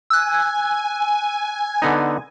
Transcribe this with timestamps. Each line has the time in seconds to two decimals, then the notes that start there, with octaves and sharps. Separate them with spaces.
0.10 G#5 E6 F#6
1.82 D3 B3 D#4